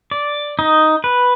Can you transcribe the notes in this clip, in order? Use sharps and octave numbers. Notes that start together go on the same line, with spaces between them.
D5
D#4
B4